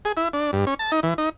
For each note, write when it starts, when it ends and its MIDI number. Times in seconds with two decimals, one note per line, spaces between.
0.05 0.12 68
0.17 0.28 64
0.33 0.51 62
0.53 0.65 43
0.67 0.74 61
0.79 0.91 81
0.92 1.00 63
1.03 1.14 52
1.18 1.29 63